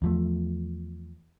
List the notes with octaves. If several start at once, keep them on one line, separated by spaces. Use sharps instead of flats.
E2 F3 A3